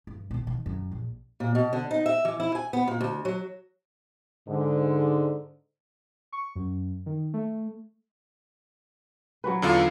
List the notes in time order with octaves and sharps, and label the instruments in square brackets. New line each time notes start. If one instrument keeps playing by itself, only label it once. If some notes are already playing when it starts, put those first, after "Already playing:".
[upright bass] G2
B2 D#3
D#3
F#2
A#1
[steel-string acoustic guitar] A#2
B2
D3
D#4
E5
E3
E4
G#5
B3
A#2
D2
F#3
[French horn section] G#2 D3
[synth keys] C#6
F#2
D#3
A3
[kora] F#3 C#4 B4
[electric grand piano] E2 D3 F4